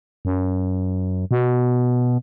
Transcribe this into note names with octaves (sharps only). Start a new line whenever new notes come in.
F#2
B2